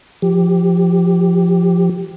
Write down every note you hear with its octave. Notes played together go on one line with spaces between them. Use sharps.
F3 G4